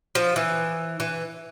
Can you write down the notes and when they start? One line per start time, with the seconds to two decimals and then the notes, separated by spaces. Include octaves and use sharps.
0.15 F3
0.36 E3
1.00 E3